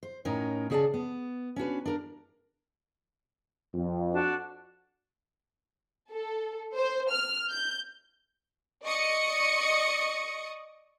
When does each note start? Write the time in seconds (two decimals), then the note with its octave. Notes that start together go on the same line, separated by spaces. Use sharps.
0.03 C5
0.25 A2 C#4 D#4 A#4 C#5
0.70 C#3 C#4 G#4 C#5 D5 A5
0.94 B3
1.56 C#4 D4 F#4 B4
1.85 D4 A#4
3.74 F2
4.12 D4 F#4
6.10 A4
6.76 C5
7.11 F6
7.49 G6
8.84 D5 D#5 C#6 D#6 C#7